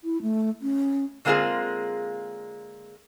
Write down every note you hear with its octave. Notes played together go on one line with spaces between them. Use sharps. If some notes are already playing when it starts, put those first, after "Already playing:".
E4
A3
C#4
D3 G#3 A#3 C4 F4 G#4